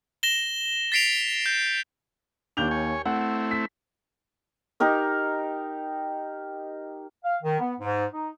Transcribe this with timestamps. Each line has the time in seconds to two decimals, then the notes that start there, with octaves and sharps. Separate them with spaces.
0.23 A#6 E7 G7
0.92 A6 B6 C7 D7 F7
1.46 G6
2.57 D#2 D4 G6 F7
2.71 C#5 G#5
3.06 A3 C4 E4 F#5
3.51 B6
4.80 D#4 G4 A#4 D#5
7.23 F5
7.42 D#3
7.59 B3
7.80 G#2
8.11 D#4